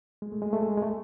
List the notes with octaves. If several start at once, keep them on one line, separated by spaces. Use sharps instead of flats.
G#3
A3
G#3
A3
G#3
G#3
A3